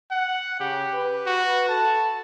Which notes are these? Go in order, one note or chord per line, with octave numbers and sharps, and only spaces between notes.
F#5
C#3 G4
B4
F#4
A4 A5